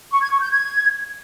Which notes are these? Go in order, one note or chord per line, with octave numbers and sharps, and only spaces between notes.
C#6
G#6
C#6
G6
G#6